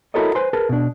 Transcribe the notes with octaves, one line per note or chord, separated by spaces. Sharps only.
E4 F#4 A4 A#4 C#5 D#5
B4 C5 G#5 C6
G#4 A#4 B4 A5
B2 D4